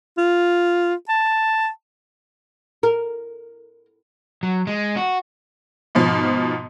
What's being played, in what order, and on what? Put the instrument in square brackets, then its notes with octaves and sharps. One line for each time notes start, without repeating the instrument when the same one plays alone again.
[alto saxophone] F4
A5
[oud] A#4
[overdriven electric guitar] F#3
G#3
F#4
[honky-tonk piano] G#2 B2 F3